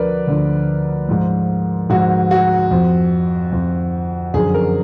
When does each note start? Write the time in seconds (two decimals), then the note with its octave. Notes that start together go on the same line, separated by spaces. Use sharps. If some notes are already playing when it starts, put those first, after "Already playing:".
Already playing: D2 D3 F3 A#4 B4 D5
0.27 D2 D3 F3
1.09 G#2 F3
1.89 G#2 F3 F#4
2.31 F#4
2.71 F2 F3
3.52 F2 F3
4.34 F#2 D3 F3 G#4
4.54 A#4